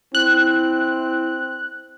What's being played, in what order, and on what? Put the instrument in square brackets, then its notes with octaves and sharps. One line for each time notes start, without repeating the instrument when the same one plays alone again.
[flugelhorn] C4 [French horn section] E4 [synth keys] F#6